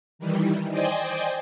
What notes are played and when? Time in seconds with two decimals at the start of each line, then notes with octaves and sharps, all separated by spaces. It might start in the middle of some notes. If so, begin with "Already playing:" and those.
0.19 D#3 E3 G3
0.71 C5 D5 D#5 G5 G#5